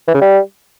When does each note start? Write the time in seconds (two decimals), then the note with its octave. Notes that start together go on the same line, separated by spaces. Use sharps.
0.08 E3
0.14 C#3
0.21 G3